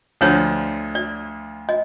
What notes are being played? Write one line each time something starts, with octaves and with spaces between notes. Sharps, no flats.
D2 D3 F3 C#5
D5
D#5